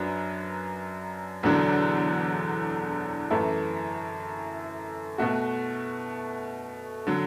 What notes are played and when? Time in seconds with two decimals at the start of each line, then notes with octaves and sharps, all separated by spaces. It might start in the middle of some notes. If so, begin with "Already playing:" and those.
Already playing: F#2 F#3 D4 B4
1.43 E1 E2 D3 F#3 D4
3.30 F#2 E3 A3 E4 A4
5.18 B2 A3 F#4
7.07 D3 F#3